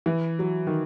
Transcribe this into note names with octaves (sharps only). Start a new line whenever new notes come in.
E3
F#3
D#3